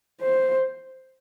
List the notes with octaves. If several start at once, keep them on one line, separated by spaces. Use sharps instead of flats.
C5